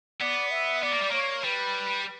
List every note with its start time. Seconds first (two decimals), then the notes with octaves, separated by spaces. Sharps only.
0.21 B3 D5
0.51 E5
0.82 B3 D5
0.92 A#3
1.02 G3
1.11 A#3 C#5
1.44 G3 B4